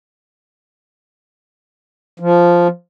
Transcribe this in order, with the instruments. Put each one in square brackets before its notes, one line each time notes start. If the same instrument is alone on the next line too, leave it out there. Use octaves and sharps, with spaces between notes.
[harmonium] F3